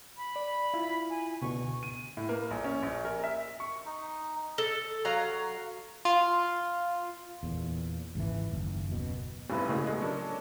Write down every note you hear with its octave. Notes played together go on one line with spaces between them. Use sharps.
B5
D5
E4 F4
G#5
C#2 B2 D3 C#6
D#7
A2
A#3
A#1
C#4
A#1
A#4
E5
C#6
D#4
A4
F#3 F5 A#5
F4
E2 A#2
G#1 C#2 C3 E3
F#1 D#2
F#2 B2
F1 B1 G2 C3 E4 B4
C#2 A2 C#3 G#3 A#3
G#3 A3 B3
F#3 C#4 D4 A#4